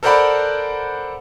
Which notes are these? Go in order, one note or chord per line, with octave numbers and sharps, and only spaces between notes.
A4 A#4 C5 D5 F#5 B5